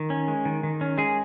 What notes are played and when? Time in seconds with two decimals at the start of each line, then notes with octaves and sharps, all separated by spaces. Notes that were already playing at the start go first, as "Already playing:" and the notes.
Already playing: D#3
0.10 C#4
0.28 G#3
0.45 D#3
0.63 D#3
0.81 C#4
0.98 G#3 G#4